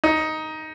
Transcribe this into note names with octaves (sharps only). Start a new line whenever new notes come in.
D#4